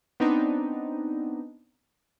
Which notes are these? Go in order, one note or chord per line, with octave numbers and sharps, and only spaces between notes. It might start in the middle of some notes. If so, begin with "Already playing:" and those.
B3 C4 D4 D#4